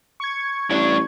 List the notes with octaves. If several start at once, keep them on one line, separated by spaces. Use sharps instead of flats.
C#6 G#6
A1 G2 D4